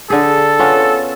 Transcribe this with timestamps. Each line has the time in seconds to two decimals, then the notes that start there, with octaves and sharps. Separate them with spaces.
0.10 D3 G#4 A4
0.59 B3 C#4 F4